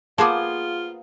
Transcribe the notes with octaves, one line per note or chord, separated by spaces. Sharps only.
A#3 B3 F4 G#4 C5 A5 D6